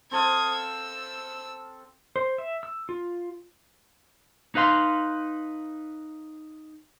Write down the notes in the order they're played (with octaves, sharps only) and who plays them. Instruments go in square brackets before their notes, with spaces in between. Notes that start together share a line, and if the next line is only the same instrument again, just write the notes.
[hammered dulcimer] C4 A4 F5 [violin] D#6 G#6
[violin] E6
[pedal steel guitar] C5
E5
E6
F4
[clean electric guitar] D#4 B4 F5 C6